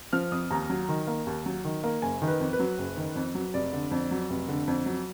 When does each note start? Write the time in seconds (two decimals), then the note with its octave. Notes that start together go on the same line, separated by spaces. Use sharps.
0.13 F3 F6
0.32 F2 D#6
0.51 D#2 A#5
0.69 F#3
0.88 D#3
1.07 A#3
1.27 D#2
1.46 F#3
1.65 D#3
1.84 A#3
2.02 F#1 G#5
2.22 D#3
2.28 B4
2.40 F2
2.53 B4
2.59 F#3
2.78 F#1
2.97 D#3
3.15 F2
3.35 F#3
3.54 F1 D5
3.73 D3
3.91 F2
4.11 F#3
4.30 F1
4.48 D3
4.68 F2
4.86 F#3